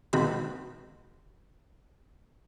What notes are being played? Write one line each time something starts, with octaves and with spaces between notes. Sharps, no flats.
B2 D#3 G#3 C4 F#4 B5